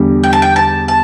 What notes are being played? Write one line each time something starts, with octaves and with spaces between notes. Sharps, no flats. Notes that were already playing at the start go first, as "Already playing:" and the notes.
Already playing: E2 D3 G3
G5
A5
G5
A5
A5